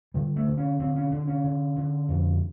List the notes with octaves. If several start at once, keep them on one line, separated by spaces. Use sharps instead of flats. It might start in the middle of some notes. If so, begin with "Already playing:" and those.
D3 G3
A3
D3
C#4
D3 C4
C#4
D3 D4
C#4
D3
D3
F2